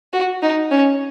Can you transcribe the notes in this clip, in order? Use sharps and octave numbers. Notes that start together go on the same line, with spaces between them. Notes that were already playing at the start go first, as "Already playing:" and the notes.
F#4
D#4
C#4